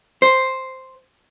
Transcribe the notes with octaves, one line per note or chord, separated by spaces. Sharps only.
C5